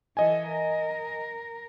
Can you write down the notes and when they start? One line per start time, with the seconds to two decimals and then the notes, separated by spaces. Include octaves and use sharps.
0.17 E3 A4 D#5 G#5
0.48 A#4